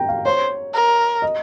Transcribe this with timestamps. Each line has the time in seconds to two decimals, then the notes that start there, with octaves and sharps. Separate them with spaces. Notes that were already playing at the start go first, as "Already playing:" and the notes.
Already playing: G5 A#5
0.09 F5
0.26 C5 C#5
0.74 A#4
1.22 D#5